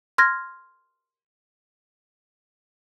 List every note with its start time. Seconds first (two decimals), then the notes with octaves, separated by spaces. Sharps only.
0.18 C6 F6 G#6 A#6